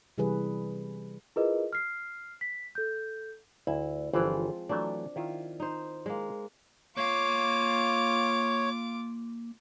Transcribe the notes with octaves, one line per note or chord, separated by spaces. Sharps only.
C3 E3 G3 G#4 B4
E4 F4 G#4 A#4 B4 D#5
F6 C7
B6
A4 G6
D2 E4
G1 E3 F3 G#3 C4
E3 F#3 A3 D4
D#3 E4 F4
D#4 C5
G#3 A#3
A#3 F4 C#5 F5 D6